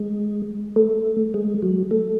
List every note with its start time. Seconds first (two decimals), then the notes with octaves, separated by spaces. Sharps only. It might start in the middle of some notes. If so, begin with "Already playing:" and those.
Already playing: G#3
0.76 A3
1.34 G#3
1.62 F#3
1.91 A3